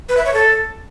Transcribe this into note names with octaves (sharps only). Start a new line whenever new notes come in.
B4
E5
C#5
A4